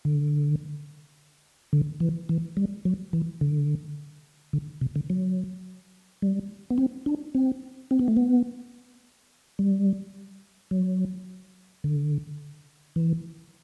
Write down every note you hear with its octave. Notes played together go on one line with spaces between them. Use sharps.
D3
D3
E3
E3
G3
F#3
E3
D3
D3
C3
D3
F#3
G3
B3
C4
D4
C4
C4
B3
A3
B3
G3
F#3
D3
E3